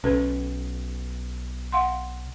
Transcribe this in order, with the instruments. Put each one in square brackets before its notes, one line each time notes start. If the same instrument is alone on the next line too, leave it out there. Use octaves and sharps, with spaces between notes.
[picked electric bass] B1 [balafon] C#4 A4 B4
[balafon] F5 F#5 C6